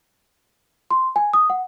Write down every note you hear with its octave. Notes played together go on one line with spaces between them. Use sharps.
C6
G#5
D#6
F#5